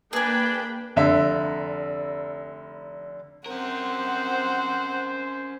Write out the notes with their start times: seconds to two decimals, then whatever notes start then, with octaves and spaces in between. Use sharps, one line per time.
0.13 A#3 D4 G#4 B4 G5 G#5 B5
0.96 F1 D3 E5
3.46 C4 C#4 A#4 C5 F#5